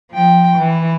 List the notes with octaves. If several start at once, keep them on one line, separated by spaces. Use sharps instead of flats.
F3 G5
E3